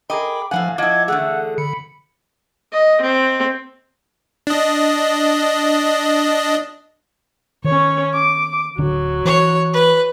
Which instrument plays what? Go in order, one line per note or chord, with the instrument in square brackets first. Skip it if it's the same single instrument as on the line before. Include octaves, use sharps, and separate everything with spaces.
[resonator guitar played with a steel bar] G#4 A#4 D#5 [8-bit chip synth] G5 D6 [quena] B5
[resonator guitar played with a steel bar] A2 B3 F#5 [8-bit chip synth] F3 G#5 [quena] F5
[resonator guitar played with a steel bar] F3 E4 [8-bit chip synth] D#5 F#5 D6 [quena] G#6
[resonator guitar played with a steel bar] D3 E3 A3 [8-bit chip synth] G#4 [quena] F#5
[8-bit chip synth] D3 C#7 [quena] B5
[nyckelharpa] D#5
C4
[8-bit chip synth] D4 D#5
[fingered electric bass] D#3 [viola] C#4 C#5
[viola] D6
[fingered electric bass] D1 D3 C#4 [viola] F#3
[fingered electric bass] E3 [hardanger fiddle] C#5
[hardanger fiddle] B4